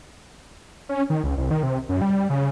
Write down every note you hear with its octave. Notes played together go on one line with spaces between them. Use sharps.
C#4
D#3
C#2
C2
D#3
C3
F#2
G3
C#3